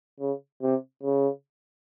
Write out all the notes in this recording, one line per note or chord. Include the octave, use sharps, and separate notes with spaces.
C#3
C3
C#3